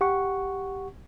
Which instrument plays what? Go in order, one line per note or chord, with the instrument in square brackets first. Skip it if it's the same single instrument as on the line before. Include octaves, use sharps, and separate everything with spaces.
[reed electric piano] G4 F#5 C#6